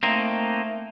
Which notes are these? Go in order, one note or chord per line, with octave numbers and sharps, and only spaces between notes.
A3 A#3 C4 D#4